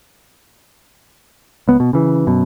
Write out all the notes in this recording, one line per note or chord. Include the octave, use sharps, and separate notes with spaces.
C#2 B3
B2
C#3 E3
F#2 B2